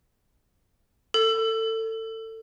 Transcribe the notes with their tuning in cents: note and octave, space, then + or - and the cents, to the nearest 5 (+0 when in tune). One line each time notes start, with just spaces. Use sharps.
A4 +25